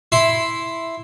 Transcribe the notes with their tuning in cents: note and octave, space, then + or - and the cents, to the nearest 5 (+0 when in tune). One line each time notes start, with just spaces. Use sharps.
E4 +0 C6 +0